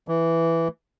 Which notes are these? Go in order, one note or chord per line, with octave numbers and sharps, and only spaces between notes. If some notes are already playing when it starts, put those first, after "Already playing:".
E3